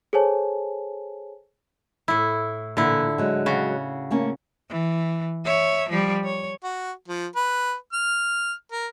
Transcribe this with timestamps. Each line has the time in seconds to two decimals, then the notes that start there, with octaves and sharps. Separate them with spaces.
0.13 G#4 A4 C5 C#5 G#5 A5
2.08 A2 E4
2.77 A#2 D3 E3 E4
3.18 F#3 G#3
3.46 C#3 F#4
4.11 A3 A#3 C#4
4.69 E3
5.45 C#5 E5
5.89 F3 G3
6.25 C#5
6.64 F#4
7.08 F3
7.36 B4
7.93 F6
8.72 A#4